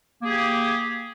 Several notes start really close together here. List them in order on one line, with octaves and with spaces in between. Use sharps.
A#3 G#4 G4